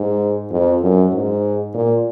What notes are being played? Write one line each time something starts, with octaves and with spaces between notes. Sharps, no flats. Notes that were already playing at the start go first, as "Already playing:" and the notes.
Already playing: G#2
F2
F#2
G#2
A#2